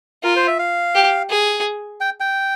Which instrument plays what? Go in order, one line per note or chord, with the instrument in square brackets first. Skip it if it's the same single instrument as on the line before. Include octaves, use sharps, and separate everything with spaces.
[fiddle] F4 [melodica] A#4
[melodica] C5
E5
F5
[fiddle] G4
G#4
[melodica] G5
G5